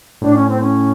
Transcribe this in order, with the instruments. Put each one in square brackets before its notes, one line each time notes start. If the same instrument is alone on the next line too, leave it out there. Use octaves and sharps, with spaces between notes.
[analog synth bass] A2 [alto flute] D4
[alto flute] C#4
C4
C#4